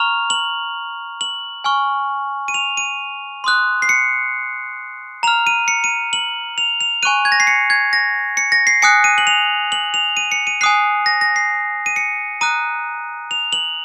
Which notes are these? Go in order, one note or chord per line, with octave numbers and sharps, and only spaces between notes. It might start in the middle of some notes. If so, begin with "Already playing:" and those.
Already playing: A#5 C#6 F6 F7
F#7
F#7
G#5 C#6 F6
D#7
F7
D#7
C6 D#6 F#6
C7
C#7
A#5 F6 F7
D#7
C#7
D#7
F#7
F7
F7
G#5 C#6 F#6 D#7
G#6
A#6
C7
C#7
G#6
A#6
C#7
A#6
C7
G#5 D#6 F#6 C#7
D#7
F#7
F7
F#7
F7
D#7
C#7
D#7
G#5 D#6 F#6 C7
A#6
A#6
C7
D#7
C#7
A#5 D#6 F#6 D#7
F7
F#7